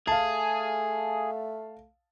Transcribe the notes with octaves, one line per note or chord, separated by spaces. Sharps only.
A3 G#4 F5 A5